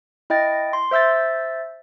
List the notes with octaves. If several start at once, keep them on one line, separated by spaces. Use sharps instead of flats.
E4 D#5 G5 A6
C6
C5 E5 E6 G6 A6